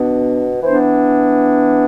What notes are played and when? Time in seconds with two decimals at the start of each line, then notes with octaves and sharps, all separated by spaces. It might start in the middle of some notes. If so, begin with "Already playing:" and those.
Already playing: B2 B3 D4
0.62 E3 B3 D4 C5